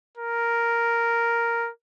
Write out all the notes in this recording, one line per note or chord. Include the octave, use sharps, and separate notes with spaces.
A#4